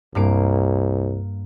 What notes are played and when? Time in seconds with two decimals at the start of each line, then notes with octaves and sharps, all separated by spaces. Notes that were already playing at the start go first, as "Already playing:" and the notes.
0.15 C2 G2 A#3 D7